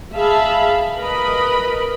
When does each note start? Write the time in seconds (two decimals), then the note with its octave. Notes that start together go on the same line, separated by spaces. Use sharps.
0.15 G#4 E5 F5 A5 B5
0.96 A#4 B4 D#5 B5